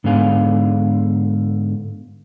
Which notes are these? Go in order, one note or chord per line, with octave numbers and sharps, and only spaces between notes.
G#2 D3 B3 F5 G#5